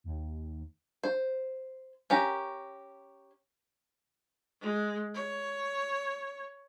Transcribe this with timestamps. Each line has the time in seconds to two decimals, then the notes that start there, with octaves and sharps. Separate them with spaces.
0.04 D#2
1.03 C5
2.10 C#4 G4 A#4
4.61 G#3
5.14 C#5